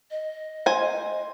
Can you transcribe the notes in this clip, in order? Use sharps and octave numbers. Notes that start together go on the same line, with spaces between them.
D#5
C5 G#5